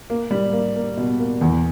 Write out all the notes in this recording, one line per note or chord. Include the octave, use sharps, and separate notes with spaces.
A#3
G3
A#3
A#3
B2
A#3
E2